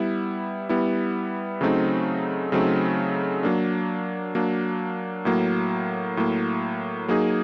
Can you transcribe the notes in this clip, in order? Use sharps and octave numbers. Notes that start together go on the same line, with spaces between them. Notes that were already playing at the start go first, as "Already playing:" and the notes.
Already playing: G3 B3 E4
G3 B3 E4
C#3 F#3 A3 C4 D#4
C#3 F#3 A3 C4 D#4
F#3 A#3 D4
F#3 A#3 D4
A2 F#3 A#3
A2 F#3 A#3
F#3 A#3 D#4 G#4